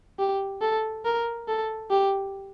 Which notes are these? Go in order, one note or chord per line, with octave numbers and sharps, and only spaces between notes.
G4
A4
A#4
A4
G4